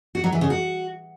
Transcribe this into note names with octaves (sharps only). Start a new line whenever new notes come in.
F#4
F#3
E3
C#3
F#4